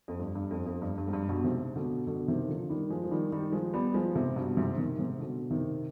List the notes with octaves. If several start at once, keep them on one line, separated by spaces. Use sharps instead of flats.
F2
G2
G2
F2
F2
G2
G2
G#2
G2
G2 B2
G#2 C3
B2 D3
B2 D3
C3 D#3
D3 F3
D#3 G3
F3 G#3
F3
D#3 G3
D#3 G3
F3 G#3
G3 B3
F3 G#3
G#2 C3
G2 B2
G#2 C3
C3 D#3
G#2 C3
B2 D3
C3 D#3